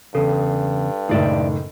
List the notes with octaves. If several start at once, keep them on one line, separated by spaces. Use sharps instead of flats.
E2 G2 C#3 A4
F#1 A2 D#3 G#4 D5 E5